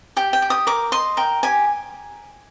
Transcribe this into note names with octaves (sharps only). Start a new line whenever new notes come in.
G4 G5
G5
G4
D#6
A#4 D6
D#5 C6
A#4 G5
G4 G#5